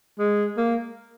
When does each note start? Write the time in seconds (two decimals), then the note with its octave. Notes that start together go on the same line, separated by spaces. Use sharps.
0.19 G#3
0.57 A#3